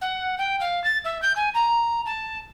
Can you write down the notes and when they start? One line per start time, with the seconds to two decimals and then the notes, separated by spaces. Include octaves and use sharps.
0.01 F#5
0.38 G5
0.60 F5
0.83 A6
1.04 E5
1.22 G6
1.35 G#5
1.54 A#5
2.05 A5